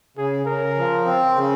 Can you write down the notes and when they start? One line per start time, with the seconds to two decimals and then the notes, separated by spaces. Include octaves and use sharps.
0.17 C#3 G#4
0.46 C#3 A#4
0.77 F3
1.05 C4
1.35 C#3